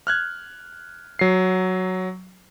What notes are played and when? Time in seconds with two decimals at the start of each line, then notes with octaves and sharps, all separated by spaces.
0.07 F6 F#6 G#6
1.19 F#3 C7